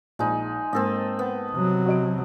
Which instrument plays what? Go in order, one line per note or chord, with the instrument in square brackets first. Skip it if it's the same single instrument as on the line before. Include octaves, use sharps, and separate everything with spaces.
[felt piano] A#1 [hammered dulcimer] G#3 D#4
[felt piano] G#2 A#3 [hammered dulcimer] C4 A4 D#5
[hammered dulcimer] B3
[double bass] C3 F#3
[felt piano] F#4 D#5 D7